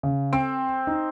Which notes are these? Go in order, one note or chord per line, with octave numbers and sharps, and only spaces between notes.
C#3
C4 D7
D#4